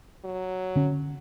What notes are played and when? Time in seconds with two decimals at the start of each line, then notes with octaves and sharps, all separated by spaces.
0.25 F#3
0.76 D3 C#4